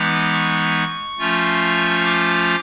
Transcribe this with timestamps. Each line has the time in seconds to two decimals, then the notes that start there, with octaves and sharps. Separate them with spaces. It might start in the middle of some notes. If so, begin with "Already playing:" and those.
Already playing: E3 G#3 B3 D#4 D6
0.32 C#6
1.18 F3 A3 C#4 F4
2.05 D6